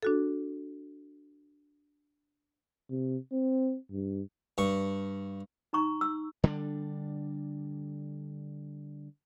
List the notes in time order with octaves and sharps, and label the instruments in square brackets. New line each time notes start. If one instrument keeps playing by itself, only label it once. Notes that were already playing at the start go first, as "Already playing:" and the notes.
[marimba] D4 F#4 A4
[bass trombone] C3
C4
G2
[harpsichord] G2 C#6
[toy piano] D#4 A#5 C#6
E6
[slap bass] D3 G3 C#4 D4